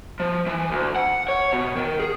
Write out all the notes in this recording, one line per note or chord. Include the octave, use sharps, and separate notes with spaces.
F3
E3
D2
F#5
C#5
B2
D#3
G#4